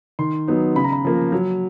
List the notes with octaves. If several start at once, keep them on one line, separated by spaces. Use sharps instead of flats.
D#3 C6
F#3 B3 D#4
C#3 B5
A#5
B5
F3 A#3
F#3